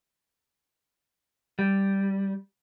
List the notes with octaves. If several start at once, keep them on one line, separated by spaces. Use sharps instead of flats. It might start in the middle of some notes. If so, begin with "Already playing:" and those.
G3